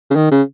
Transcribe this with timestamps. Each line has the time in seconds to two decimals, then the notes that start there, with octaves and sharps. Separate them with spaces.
0.10 C#3
0.16 D#3
0.31 C#3